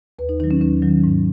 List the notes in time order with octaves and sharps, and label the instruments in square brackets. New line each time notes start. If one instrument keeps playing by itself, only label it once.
[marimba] D#2 B4
D#4
D#3 F#3 D#4
C#4
D#2 C#4
D#3 F#3
G#2